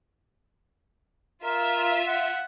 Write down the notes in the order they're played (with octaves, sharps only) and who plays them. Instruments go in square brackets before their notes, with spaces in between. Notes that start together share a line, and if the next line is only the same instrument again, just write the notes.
[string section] F4 E5 [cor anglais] A#4
[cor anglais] F#5